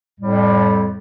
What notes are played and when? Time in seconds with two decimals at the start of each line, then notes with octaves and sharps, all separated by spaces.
0.20 F2 A2 G3